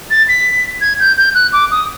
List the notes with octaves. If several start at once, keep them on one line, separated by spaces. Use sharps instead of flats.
A6
B6
G#6
G6
G6
F#6
D6
D#6